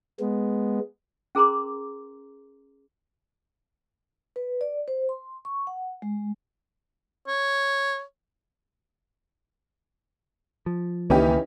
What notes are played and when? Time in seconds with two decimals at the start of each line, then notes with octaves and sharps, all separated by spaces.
0.20 G#3 B3
1.35 C#4 G#4 A#4 A#5 C6 D6
4.36 B4
4.61 D5
4.88 C5
5.09 C6
5.45 C#6
5.67 F#5
6.02 G#3
7.28 C#5
10.66 F3
11.10 C#2 D#3 E3 A#3 C#4 D#4 G4